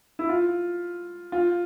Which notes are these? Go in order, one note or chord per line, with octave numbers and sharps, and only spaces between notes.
E4
F4
F4